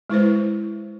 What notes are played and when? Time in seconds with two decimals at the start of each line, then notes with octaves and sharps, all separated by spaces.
0.10 G#3 E4 B4 C5